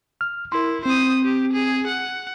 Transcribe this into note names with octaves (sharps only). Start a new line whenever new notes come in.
F6
E4 A#4 C6
C4 C5 D#6
G4
G#4
F#5